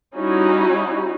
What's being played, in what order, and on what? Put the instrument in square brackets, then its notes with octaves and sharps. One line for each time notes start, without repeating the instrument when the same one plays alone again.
[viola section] G3 C#4 D#4 E4 F#4